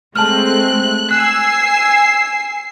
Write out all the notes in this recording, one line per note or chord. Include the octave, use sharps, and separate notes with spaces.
G#3 A3 C4 A5 F6 F#6
G#5 E6 F#6 C7